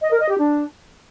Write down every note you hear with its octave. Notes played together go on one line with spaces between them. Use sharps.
D#5
A#4
D#5
G4
D4